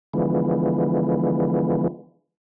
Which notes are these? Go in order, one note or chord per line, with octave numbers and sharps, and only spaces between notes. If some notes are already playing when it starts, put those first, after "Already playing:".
D3 E3 F3 G#3 B3